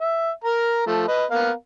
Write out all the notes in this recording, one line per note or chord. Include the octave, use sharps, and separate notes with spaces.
E5
A#4 A#5
F3 A3
B4 D#5
B3 A#4 F5